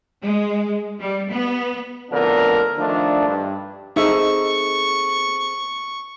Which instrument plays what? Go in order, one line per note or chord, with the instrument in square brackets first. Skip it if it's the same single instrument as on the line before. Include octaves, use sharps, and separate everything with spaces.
[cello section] G#3
G3
B3
[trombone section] F2 A2 D3 B3 D4 A#4
D#3 F3 A3 D4
G2
[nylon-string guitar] C4 G#4 A4 [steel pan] D#4 E5 [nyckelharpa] C#6